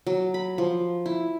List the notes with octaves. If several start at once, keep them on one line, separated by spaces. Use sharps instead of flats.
F#3
B5
F3
E4